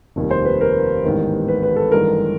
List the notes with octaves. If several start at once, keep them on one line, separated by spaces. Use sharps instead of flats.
F1 D#2 D#3 G3
C5
B4
A#4
A1 G#2 D#3 G3 B3
B4
B4
A4
A1 G2 D#3 G#3 A#4